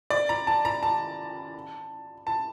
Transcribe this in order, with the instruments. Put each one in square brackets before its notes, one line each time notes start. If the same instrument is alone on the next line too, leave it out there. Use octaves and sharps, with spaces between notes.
[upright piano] D5
A#5
A5
A#5
A5
A5